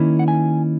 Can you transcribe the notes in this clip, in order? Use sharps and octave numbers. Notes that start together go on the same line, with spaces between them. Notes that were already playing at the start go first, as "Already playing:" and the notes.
Already playing: D#3 A#3 C#4 E4
F#5
G#5